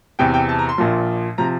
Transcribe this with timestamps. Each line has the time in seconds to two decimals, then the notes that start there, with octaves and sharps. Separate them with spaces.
0.19 E2 C3 E3 G5
0.34 G5
0.49 A5
0.59 A#5
0.69 C6
0.78 A#1 A#2 F3
1.38 C3 F3 A#5